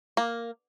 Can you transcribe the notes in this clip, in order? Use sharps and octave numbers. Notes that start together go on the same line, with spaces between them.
A#3